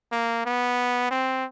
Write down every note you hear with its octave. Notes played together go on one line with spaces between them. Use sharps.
A#3
B3
C4